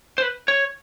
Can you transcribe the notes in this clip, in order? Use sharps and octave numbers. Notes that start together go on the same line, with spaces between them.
C5
B4
C#5